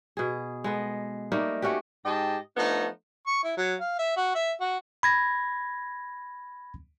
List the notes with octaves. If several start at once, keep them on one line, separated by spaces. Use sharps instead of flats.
B2 G#4
G#3 B3 A4
G3 A3 A#3 D#4
A3 C#4 F#4 G4
G#2 G4 D#5 G5 A5
F3 A3 B3 D4 D#4
C#6
E4
F#3
F5
E5
F#4
E5
F#4
B5 G#6 A#6